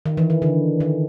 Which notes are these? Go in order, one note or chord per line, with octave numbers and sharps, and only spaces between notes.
D#3
E3
D#3
D3
D#3